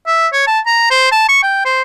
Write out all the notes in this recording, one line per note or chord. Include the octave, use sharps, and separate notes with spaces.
E5
C#5
A5
A#5
C5
A5
C#6
G5
C5